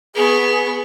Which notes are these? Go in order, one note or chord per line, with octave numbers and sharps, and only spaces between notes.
B3 G#4 C#6